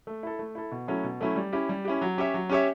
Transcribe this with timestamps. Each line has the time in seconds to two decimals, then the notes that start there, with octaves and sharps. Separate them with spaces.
0.07 A3
0.23 E4 A4
0.39 A3
0.55 E4 A4
0.71 B2
0.88 F#3 A3 C#4 E4
1.04 B2
1.20 F#3 A3 C#4 E4
1.36 G3
1.53 C#4 E4 G4
1.69 G3
1.85 C#4 E4 G4
2.01 F#3
2.18 C#4 G4 C#5 E5
2.34 F#3
2.49 C#4 G4 C#5 E5